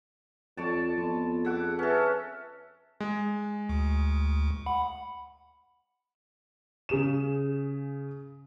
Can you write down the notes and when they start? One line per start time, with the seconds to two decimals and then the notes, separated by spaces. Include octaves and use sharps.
0.57 F2 C#5 D5 A5
0.98 F2 B3 C4
1.45 G#4 E5 F#5 D6
1.79 C#4 A4 B4 E5
3.00 G#3
3.69 D2
4.66 F#5 B5
6.89 C#3 G#4 E7